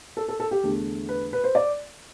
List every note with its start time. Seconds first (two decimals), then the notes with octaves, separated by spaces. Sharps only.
0.17 A4
0.28 A4
0.40 A4
0.51 G4
0.63 E2 D3 A3
1.09 B4
1.33 B4
1.44 C5
1.55 D5